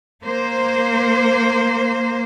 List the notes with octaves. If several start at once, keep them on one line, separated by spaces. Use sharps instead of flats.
A#3 C5